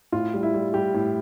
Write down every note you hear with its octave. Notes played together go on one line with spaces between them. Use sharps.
A2 F4
G3
E4
G3
G3 G4
A2